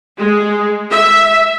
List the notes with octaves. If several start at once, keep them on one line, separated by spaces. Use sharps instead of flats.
G#3
E5